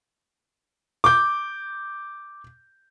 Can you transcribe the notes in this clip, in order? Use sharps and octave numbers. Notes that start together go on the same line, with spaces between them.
D6 G6